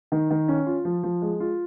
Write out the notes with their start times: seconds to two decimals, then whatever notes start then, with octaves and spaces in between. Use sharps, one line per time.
0.12 D#3
0.30 D#3
0.48 C#4
0.66 F4
0.85 F3
1.03 F3
1.22 G#3
1.40 F4